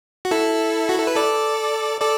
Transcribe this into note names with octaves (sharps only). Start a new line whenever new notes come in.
F#4
E4 A4
F#4
A4
B4
A4 D5
A4 D5